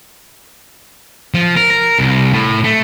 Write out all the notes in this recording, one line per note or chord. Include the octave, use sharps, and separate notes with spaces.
F3
A#4
A#4
C2
A2
A3